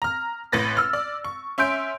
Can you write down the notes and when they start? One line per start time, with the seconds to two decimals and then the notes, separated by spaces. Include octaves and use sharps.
0.02 A#5 F6
0.52 A1 A2 B4 A6 A#6
0.77 E6 F6
0.93 D5
1.24 C#6
1.58 C#4 E5 C6 G6 D7